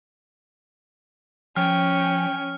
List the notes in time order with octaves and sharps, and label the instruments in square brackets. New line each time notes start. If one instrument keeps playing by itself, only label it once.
[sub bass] F3 [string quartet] C#4 [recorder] G5 [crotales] F6